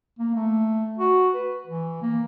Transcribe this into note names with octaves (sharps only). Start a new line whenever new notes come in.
A#3
A3
F#4
B4
E3
A#3